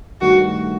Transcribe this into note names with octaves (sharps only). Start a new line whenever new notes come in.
G2 D#3 A3 F#4